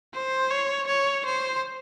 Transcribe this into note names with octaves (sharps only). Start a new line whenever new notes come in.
C5
C#5
C#5
C5